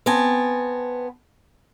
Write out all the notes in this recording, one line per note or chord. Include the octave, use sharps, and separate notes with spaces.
B3 C4 G#5 A5